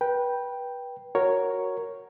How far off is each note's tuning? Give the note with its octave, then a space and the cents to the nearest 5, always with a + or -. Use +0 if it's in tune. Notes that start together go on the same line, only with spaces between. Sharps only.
B4 -25 G5 +0
F#4 +0 A#4 +0 C#5 +0